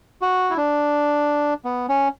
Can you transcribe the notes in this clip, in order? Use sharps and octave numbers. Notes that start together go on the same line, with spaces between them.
F#4
E4
D4
B3
C#4